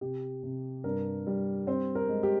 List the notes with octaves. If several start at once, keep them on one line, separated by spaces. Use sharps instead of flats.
C3 G4
C3
G2 A#4
G3
C4 C5
A#4
G#3
G4